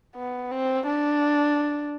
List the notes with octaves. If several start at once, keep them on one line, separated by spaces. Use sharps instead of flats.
B3
C4
D4